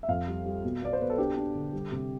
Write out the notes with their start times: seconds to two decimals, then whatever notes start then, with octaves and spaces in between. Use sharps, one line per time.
0.03 E5
0.08 F2 F5
0.27 G3
0.46 G3
0.64 B2
0.82 B3 D5
0.93 C5
1.00 B2 B4
1.10 A4
1.18 D4 G4
1.37 D4
1.55 D3
1.73 G3
1.92 C3